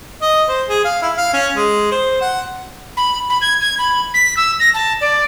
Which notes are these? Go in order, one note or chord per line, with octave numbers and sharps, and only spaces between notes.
D#5
C5
G#4
F5
E4
F5
C#4
G#3
C5
F#5
B5
B5
G#6
G#6
B5
B6
E6
A#6
A5
D5